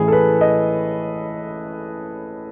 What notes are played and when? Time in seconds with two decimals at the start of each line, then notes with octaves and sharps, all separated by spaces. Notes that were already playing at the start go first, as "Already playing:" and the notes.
Already playing: A1 A2 E3 G#4
0.08 A4
0.12 B4
0.41 D#5